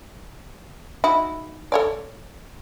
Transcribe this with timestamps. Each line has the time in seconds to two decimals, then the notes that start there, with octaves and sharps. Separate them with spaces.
1.04 D#4 E4 F#4
1.72 A4 C#5 D5